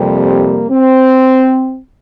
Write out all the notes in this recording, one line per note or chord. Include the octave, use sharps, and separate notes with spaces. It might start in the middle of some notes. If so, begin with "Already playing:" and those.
Already playing: F2 C3 G3 A#3
C4